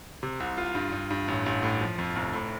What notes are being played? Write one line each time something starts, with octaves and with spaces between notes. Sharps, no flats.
C3
C2
F4
G2
G2
G2
A1
A1
A2
F3
F2
F1
A2